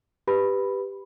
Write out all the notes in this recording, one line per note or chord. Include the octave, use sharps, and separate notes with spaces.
G4 B4 B5